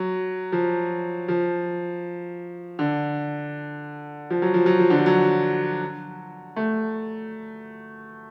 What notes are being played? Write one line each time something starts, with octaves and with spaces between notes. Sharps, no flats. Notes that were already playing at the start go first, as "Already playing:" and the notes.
Already playing: F#3
F3
F3
D3
F3
F#3
F3
F#3
F3
D3
F3
F#3
A3